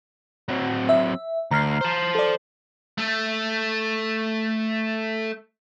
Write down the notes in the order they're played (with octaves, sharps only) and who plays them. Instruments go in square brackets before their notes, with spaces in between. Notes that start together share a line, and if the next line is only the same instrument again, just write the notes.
[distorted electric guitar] F#3 C4
[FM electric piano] E5
[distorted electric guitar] D2 [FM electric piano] A#5 F6 C7
[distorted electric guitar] C5 A5
[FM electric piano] A4 D5
[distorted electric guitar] A3 A4